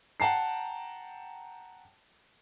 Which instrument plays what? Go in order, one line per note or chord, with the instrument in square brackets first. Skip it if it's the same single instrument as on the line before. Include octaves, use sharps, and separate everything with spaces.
[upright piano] F#5 G5 A5 A#5 C7